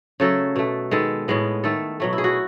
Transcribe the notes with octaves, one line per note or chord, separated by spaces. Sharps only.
C#3 F#3 A3 A4
B2 A3
D#3 G#3 B3 A4
A2 G#3 B3
D#3 A3 A4
B2 F#3 A3
E4
G#4
F#4